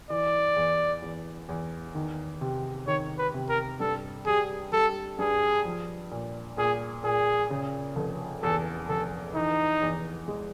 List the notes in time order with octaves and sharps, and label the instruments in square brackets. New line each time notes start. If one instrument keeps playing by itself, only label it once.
[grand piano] E3 [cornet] D5
[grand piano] E2
E2
E2
D#3
C3
[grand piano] D#3 [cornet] C#5
[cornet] B4
[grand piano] C3
[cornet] A#4
[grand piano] G2 [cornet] A4
[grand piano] G3 [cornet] G#4
[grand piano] G3 [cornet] A4
[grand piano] G2 [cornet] G#4
[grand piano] F3
A#2
[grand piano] A#2 [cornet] G#4
[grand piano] A#2 [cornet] G#4
[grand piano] C#3
F1
[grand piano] E2 [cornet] A4
[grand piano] F1 [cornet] A4
[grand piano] E3 [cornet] D#4
[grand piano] E2
G#3